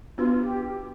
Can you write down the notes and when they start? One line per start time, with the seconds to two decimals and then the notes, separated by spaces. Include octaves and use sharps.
0.17 B3 D4 F4 F#4 B4
0.39 G4